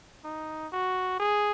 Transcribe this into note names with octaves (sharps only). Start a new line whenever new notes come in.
D#4
F#4
G#4